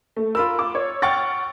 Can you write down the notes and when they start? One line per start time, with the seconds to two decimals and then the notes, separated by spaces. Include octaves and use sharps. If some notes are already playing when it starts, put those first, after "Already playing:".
0.17 A3
0.35 F4 A#4 B5 E6
0.59 D6
0.75 C#5
1.02 F#5 G5 C#6 F6 A6